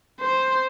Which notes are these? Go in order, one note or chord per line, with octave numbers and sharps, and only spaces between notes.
C5